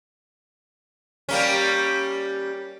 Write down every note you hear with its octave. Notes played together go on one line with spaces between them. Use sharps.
G3 A#3 C#4